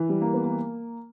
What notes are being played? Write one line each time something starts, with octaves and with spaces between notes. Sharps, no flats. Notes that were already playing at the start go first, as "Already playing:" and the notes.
Already playing: E3
G3
A#3
B3
A#3